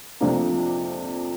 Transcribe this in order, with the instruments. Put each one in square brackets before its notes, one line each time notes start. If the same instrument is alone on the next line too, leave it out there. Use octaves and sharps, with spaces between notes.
[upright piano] F2 C3 F3 A#3 D4